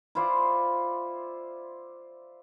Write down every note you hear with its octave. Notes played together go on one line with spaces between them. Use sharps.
E4 F4 C5 D5